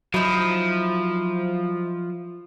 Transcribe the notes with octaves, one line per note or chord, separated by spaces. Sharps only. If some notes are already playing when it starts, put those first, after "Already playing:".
F3 F#3 D#4 E4